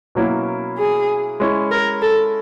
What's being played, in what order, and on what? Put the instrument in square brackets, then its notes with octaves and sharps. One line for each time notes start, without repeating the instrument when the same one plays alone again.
[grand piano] B2 F#3 A#3 C#4 E4
[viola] G#4
[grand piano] G#3 C#4 E4
[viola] A#4
A4